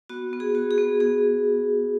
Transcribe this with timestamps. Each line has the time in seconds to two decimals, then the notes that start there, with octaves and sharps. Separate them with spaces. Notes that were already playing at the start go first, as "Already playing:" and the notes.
0.09 B3 F#4
0.33 B3
0.40 G#4
0.55 F#4
0.71 G#4
0.78 B3
1.00 B3 G#4